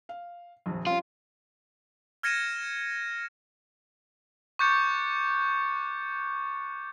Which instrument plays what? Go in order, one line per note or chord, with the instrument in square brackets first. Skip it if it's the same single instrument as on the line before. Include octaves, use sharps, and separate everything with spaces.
[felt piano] F5
D#1 A#1 F2
[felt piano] F3 G3 C#4 [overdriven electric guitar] F4
[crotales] F6 G#6 A#6 C#7 D#7 E7
C#6 D6 F#6 G6 A6 C#7